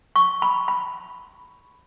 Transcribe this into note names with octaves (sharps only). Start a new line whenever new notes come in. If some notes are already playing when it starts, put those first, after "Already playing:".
C#6
B5
B5